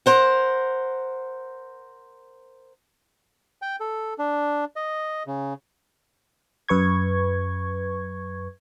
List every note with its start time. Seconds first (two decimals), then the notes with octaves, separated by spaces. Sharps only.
0.06 A#4 C5 F#5
3.62 G5
3.80 A4
4.19 D4
4.76 D#5
5.27 C#3
6.69 F#2 B4 C#6 G#6